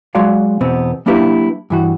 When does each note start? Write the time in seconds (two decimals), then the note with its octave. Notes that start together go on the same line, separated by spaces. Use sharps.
0.15 F#3 G#3 F#4 D5 F5
0.61 E2 B2 B3 C4
1.06 F#3 A#3 D4 E4 G4 B4
1.70 G2 E3 F#4